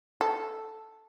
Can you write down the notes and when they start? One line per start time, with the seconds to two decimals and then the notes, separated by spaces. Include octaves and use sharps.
0.21 A4